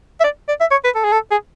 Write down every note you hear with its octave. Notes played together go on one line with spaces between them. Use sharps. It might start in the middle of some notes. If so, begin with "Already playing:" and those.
E5
D5
D5
E5
C#5
B4
A4
G#4
A4
G#4